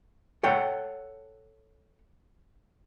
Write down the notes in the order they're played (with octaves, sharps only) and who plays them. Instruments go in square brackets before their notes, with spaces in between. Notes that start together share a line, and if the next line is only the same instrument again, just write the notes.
[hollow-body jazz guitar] A4 C#5 F#5 G5